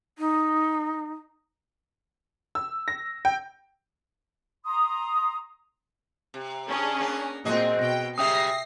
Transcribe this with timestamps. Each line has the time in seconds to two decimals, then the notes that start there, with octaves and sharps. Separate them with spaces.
0.18 D#4
2.55 E6
2.88 A#6
3.25 G5
4.65 A#5 C6 D#6
6.34 C3
6.68 C#4 D4 G#4
7.00 A#3 B3
7.45 A#2 C4 F#4 G#4 D#5
7.79 B2 G5 A#6
8.18 F#2 C#3 G3 E5 G5 D#6 A#6 C7